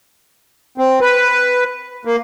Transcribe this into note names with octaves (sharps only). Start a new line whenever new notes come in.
C4
B4
A#3